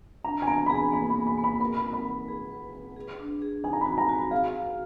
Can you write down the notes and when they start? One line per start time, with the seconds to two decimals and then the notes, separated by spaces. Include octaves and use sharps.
0.24 D4 A#5
0.42 G#5
0.47 B3 A#5
0.66 B5
0.70 G#4 A#5
0.92 A#3 B5
1.10 B5
1.16 A#3
1.27 B5
1.38 A#3
1.44 B5
1.60 A#4 B5
1.77 B5
1.83 D#4
1.93 B5
2.05 F#5
2.28 G#4
2.51 B4
2.73 B4
2.96 G#4
3.19 D4
3.42 G#4
3.64 D#4 G#5
3.73 A#5
3.81 F#4 B5
3.98 A#5
4.09 F#4
4.31 G#4 F5
4.55 F#5